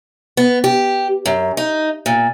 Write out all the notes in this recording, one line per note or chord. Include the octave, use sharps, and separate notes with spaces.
B3
G4
F#2
D#4
A#2